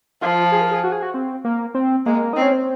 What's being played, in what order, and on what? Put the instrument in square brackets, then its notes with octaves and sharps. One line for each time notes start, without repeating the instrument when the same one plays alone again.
[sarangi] F3 [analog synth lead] F4
[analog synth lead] G#4
A#4
G#4
F#4
G#4
F#4
C4
A#3
C4
[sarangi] G#3 [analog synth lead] A#3
[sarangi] C4 [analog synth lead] D#4
[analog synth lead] C#4
C4